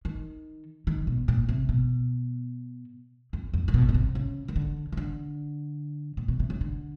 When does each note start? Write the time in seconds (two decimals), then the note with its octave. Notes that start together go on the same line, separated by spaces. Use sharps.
0.05 D#3
0.87 D#3
1.07 B2
1.28 A#2
1.49 C3
1.69 B2
3.33 F2
3.54 F2
3.68 A#2
3.74 B2
3.89 B2
3.94 C3
4.15 C#3
4.48 D#3
4.56 D3
4.92 D#3
4.97 D3
6.17 A#2
6.28 B2
6.40 C3
6.50 C#3
6.61 D3